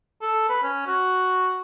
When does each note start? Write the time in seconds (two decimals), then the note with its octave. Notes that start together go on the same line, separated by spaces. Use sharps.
0.21 A4
0.49 B4
0.63 C#4
0.87 F#4